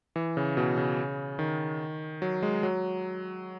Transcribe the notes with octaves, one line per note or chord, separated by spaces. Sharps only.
E3
C#3
B2
C#3
D#3
F#3
G#3
F#3